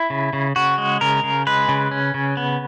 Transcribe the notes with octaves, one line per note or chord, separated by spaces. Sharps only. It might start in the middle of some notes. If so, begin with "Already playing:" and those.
Already playing: E4
C#3
C#3
C#3 F#4
G#3
C#3 A#4
C#3
G#3 B4
C#3
C#4
C#3
B3